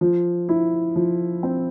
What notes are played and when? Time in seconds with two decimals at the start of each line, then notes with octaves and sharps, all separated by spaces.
0.01 F3
0.49 E4
0.96 F3
1.43 C4